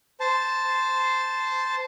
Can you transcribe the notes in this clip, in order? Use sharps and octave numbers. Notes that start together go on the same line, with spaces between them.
C5 A5